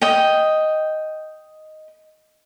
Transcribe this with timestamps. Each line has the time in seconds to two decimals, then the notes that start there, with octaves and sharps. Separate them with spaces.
0.01 D#5 G5